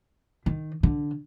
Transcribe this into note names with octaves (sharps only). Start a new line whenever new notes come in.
D#3
D3